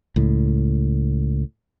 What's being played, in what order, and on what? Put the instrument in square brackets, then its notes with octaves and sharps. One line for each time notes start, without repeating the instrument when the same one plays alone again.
[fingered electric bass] C#2 A2